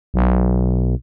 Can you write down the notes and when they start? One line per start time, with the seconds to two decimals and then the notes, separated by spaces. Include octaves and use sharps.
0.14 B1